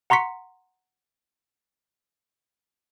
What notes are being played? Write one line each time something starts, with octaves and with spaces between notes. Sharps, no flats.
F#5 A#5 C6 C#6 B6 C#7